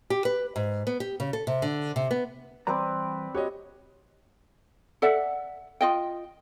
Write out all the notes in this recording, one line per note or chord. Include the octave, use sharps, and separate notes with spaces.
G4
B4
G#2
B3
G4
C#3
A4
C3
D3
C3
B3
E3 G3 C4 B4 D5 A#5
F#4 G4 C#5 D#5
A4 D5 E5 F#5
F4 D#5 G5